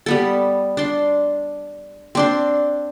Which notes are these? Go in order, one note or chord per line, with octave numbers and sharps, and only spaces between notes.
G3 B3 A4
D4 C6
C4 D4 C6